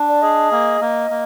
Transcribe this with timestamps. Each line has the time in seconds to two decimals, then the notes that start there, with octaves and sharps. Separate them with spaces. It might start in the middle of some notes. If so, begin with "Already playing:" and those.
Already playing: D4
0.08 D5
0.22 G#4 D#5
0.52 A#3
0.81 A#3
1.11 A#3